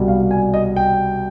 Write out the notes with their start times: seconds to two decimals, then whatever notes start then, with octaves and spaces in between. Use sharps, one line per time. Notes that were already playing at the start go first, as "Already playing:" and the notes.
Already playing: C2 B2 G3
0.08 F5
0.31 G#5
0.54 D#5
0.76 G5